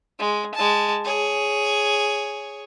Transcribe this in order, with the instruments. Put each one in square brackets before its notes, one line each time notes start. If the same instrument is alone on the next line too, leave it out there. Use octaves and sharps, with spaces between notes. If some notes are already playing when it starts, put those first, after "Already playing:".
[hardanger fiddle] G#3
G#3 A5
G#4 C#5